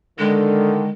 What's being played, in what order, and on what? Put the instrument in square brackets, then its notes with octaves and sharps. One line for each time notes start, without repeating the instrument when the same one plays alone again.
[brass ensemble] D3 D#3 [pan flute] G#3